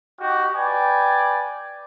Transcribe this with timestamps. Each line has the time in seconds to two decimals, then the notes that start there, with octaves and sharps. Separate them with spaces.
0.19 D#4 F#4 G4
0.55 B4 D5 G5 G#5